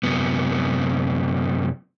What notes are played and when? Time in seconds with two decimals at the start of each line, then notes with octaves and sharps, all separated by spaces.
0.03 F#2 C3 B3